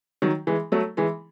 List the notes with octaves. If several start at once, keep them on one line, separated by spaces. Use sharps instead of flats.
D#3 F#3
E3 G#3
F#3 A3
E3 G#3